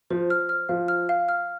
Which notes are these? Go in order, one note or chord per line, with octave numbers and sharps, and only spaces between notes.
F3 C5
F6
F6
F3 F5
F6
F5
F6